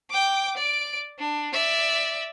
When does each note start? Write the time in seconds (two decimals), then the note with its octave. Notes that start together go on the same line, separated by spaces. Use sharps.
0.10 G5 D6
0.57 D5 D7
1.19 D4
1.54 D5 E5